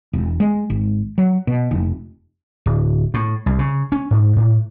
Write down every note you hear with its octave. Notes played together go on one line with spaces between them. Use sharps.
E1
G#3
G#1
F#3
B2
F1
D1
A2
C2
C#3
C#4
G#2
A2